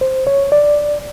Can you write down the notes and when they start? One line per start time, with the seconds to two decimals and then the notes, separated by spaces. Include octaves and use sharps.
0.01 C5
0.27 C#5
0.52 D5